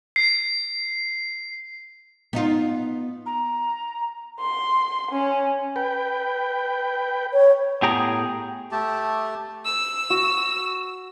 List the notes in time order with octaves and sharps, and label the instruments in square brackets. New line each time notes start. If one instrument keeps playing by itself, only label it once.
[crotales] C7
[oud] B3 D#4 F4
[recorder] A#5
[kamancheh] C6
C#4
[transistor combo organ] B4 G5
[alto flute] C#5
[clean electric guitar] A2 B3 G4 G#4 G5 A#5
[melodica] A3 G4 A5
[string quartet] E6
[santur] F#4